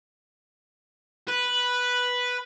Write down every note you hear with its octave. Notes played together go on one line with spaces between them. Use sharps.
B4